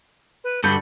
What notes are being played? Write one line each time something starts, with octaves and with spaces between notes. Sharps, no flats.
B4
G2 D3 F#4 A4 B5 G6